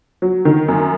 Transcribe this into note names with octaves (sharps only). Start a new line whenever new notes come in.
F#3
D#3
F#2